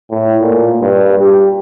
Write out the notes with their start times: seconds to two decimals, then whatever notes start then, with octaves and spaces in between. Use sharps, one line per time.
0.10 A2
0.41 A#2
0.81 G2
1.18 G4